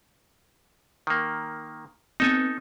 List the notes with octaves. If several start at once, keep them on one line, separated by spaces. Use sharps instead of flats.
D#3 A#3
B3 C4 D#4 A4 G#5